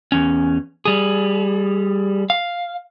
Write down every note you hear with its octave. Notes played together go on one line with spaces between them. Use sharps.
E2 C#4
G3 G#4
F5